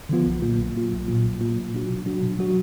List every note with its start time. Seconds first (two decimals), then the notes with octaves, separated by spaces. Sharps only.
0.09 D3 F3 B3 F4
0.26 B1
0.42 A#2 F#3 A#3 F4
0.59 B1
0.75 A#2 F#3 A#3 F4
0.92 B1
1.08 A#2 F#3 A#3 F4
1.24 B1
1.40 A#2 F#3 A#3 F4
1.58 B2
1.73 F#3 D4 F#4
1.90 B2
2.06 F#3 D4 F#4
2.23 B2
2.39 F#3 D4 F#4